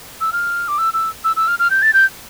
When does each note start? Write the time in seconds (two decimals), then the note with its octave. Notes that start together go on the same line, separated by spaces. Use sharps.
0.21 E6
0.33 F6
0.68 D6
0.78 E6
0.94 E6
1.24 E6
1.36 E6
1.48 F6
1.59 F6
1.71 G6
1.82 A6
1.94 G6